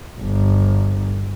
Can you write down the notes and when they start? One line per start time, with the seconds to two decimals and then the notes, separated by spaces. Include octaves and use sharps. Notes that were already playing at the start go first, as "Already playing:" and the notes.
0.20 G1